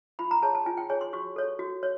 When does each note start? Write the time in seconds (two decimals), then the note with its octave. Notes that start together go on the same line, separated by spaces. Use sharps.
0.19 F4 B5
0.31 A#5
0.42 G#4 C#5 A5
0.55 A5
0.66 F4 G#5
0.77 G5
0.90 G#4 C#5 G#5
1.01 C6
1.13 F#4 C#6
1.36 A4 C#5
1.59 F#4
1.83 C#5